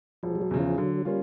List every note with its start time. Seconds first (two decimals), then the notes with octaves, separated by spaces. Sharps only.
0.23 E1 F3
0.35 G3
0.42 F#3
0.51 E2 C#3
0.60 F3
0.78 D3 F#3
1.05 G3 A#3 C#4 F4